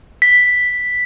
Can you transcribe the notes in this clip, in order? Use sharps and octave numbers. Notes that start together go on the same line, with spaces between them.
B6